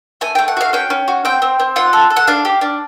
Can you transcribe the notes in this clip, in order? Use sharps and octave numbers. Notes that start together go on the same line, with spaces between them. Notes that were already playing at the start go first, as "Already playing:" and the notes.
A3 G#5
A3 G5
F#5
F#4 F5
C#4 G5
C#4
F#4
C4 G5
C4
C4
F4 F#5
A4
A4
F#5
D4 F5
G4
D4